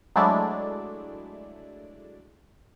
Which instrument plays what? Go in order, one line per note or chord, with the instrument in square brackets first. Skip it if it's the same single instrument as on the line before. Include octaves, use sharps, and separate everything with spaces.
[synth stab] F#3 G#3 A3 D4 E4 D5